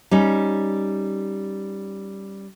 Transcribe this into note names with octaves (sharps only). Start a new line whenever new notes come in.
G3 C#4 D#4